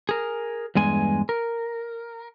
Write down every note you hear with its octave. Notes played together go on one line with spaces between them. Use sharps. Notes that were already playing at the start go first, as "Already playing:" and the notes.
G#4 A#4
E2 G2 G#3 G#5
A#4